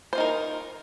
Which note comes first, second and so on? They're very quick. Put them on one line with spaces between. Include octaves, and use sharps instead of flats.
C5 F4 D#4 A#4